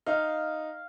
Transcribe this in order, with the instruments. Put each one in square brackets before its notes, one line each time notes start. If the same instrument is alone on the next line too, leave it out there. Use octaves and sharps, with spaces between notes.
[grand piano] D#4 [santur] F5